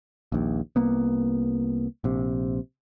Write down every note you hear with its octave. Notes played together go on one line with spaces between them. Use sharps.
A#1 D#2
C2 A#3 B3
A#1 C3